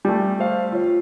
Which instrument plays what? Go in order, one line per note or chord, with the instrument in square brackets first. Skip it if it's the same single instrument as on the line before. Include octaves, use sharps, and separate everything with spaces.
[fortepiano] G3 A3
[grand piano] C5 F5
F4 C#5